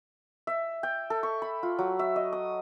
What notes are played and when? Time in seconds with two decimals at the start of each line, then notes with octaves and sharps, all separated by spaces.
0.47 E5
0.83 G5
1.10 A4
1.23 C#6
1.42 B5
1.63 F4
1.79 F#3
1.99 E5
2.16 D#5
2.33 D#6